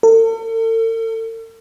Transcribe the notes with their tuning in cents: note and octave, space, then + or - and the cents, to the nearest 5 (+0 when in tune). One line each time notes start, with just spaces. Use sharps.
A4 +45